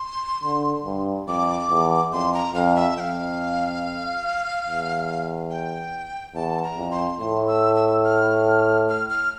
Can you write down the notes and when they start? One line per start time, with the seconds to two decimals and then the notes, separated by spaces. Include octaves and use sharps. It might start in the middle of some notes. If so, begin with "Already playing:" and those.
Already playing: C6
0.43 D3
0.85 G2
1.28 F2 D6
1.71 E2
2.13 F2 C6
2.34 A#5
2.54 F2 F5
2.76 E5
2.97 F2 F5 G5
4.66 E2
5.50 G5
6.35 E2 A5
6.63 A#5
6.77 F2
6.91 C6
7.20 A2 C6
7.48 E6
7.76 E6
8.04 F6
8.89 F6
9.10 F6